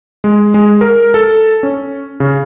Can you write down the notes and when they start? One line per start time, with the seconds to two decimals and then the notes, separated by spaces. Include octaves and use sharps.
0.24 G#3
0.54 G#3
0.81 A#4
1.14 A4
1.63 C#4
2.20 C#3